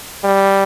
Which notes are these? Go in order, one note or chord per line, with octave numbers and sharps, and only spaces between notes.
G3